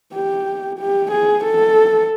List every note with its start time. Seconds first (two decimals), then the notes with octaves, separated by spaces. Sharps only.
0.14 G4
0.79 G4
1.12 G#4
1.44 A4